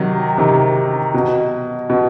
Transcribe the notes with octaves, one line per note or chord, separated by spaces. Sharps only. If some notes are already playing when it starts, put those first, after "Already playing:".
Already playing: C3 D#3 F#3
C3 D#3
B2
B2